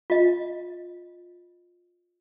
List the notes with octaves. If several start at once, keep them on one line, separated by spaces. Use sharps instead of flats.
F4 D#5